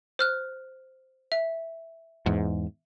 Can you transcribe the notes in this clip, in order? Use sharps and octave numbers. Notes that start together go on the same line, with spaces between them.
C5 F6 F#6
E5
E2 G#2